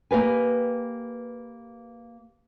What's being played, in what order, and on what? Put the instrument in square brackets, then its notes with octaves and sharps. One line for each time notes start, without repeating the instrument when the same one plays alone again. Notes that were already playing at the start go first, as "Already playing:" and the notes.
[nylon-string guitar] A#3 G4 B4 G#5